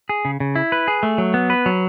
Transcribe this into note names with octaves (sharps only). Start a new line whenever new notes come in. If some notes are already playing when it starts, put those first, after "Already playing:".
G#4
C#3
C#3
E4
B4
G#4
A3
F#3
B3
B4
F#3